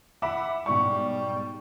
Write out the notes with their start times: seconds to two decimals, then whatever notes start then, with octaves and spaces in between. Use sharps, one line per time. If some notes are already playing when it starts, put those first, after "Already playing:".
0.22 E5 F#5 B5 D6
0.66 B1 G#2 G3 C#6